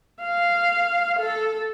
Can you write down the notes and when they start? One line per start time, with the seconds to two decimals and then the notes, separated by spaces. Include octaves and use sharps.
0.22 F5
1.19 A4